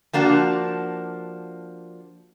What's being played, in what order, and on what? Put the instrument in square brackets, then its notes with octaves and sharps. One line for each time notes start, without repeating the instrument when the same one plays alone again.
[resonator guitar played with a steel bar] F3 A#3 D4 F#4